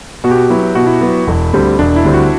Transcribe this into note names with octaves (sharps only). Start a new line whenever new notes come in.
B2 F#4
G4
F#4
F#3 B3 E4
E4
B2 F#4
E4
F#3 B3
E1
D2 D3 G3 C4
E1 D4
E4
D2 D3 G3 C4
F#4